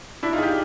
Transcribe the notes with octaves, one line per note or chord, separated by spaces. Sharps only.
D4 E4
D#4 F4
G#4
F4 G4